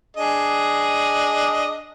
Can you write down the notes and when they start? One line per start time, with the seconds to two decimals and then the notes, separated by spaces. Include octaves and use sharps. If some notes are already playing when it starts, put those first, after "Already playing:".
0.17 D4 G#4 D#5